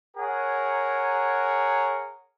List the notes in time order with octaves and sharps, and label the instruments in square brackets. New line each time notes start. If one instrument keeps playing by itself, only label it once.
[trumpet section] G#4 A#4 C#5 F#5